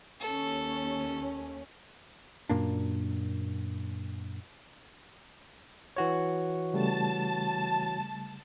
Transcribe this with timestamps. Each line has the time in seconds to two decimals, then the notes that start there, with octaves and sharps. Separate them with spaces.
0.21 D#2 C#4 A4
2.49 F#2 A#2 A#3 D4
5.96 E3 F#4 C#5
6.74 C#3 G3 A3 A5